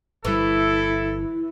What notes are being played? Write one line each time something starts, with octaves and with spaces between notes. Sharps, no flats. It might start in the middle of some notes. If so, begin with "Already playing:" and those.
G1 E3 G3 E4 A4